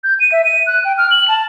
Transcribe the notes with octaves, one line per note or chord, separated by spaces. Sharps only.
G6
D#7
E5
D#7
F#6
G5
F6
F#7
A5